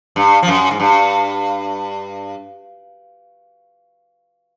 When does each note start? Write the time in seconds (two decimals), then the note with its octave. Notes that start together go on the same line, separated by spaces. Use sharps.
0.16 G2
0.43 F3
0.48 F#2
0.71 G#2
0.80 G2